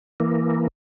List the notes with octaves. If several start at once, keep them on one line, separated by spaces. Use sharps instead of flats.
E3 A#3